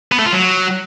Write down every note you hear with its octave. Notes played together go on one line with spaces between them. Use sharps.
B3
A3
F4
F#3